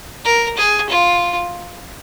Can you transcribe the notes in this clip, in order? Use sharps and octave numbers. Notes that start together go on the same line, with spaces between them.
A#4
G#4
F4